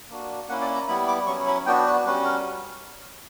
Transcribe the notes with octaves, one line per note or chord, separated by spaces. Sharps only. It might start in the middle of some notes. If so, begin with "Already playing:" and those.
A#3 D4 F#4
A#3 C#4 E4 F#5
D5
A#5
G3 B3 E4 B5
D6
F#3 C#4 E4 C#6
B5
B3 D4 F#4 G5
B4
G3 C#4 F#4 B4
A#4